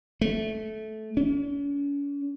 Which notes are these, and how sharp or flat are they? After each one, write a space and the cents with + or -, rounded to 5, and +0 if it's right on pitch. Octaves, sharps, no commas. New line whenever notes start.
A3 -15
C#4 +40